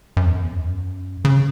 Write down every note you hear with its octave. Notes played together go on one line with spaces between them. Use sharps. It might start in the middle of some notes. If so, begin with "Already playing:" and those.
F#2
E2
F#2
E2
F#2
C#3